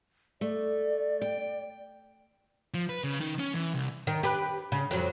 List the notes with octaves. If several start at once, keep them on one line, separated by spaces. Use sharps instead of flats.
A3 D5
G5
F3
B4
C#3
D#3
C#4
E3
C2
D#3
G4 B4
C#3
F2 F#3